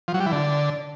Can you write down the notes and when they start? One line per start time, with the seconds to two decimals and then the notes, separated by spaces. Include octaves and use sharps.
0.08 F3
0.14 F#3
0.20 G3
0.26 E3
0.32 D3